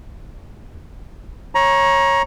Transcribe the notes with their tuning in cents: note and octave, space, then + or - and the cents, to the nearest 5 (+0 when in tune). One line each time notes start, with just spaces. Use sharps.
C#5 -15 A#5 +20